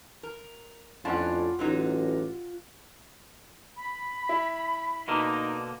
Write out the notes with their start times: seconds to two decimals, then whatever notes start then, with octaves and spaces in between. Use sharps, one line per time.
0.23 A#4
1.05 F2 A2 C#4 D4 F4 F#5
1.59 A1 D3 F#3 D#4
3.77 B5
4.29 E4
5.08 B2 D3 A#3 D#4